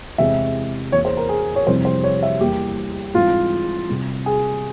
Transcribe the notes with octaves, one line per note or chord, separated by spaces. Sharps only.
E2 C3 E3 G#3 C4 E5
E2 E3 A#3 C#5
C5
A#4
G#4
C#5
F2 C3 E3 G3 C4 C5
C5
C#5
E5
E2 E3 G3 A#3 G4
G#2 E3 G3 C4 F4
C3 G3 C4
G#4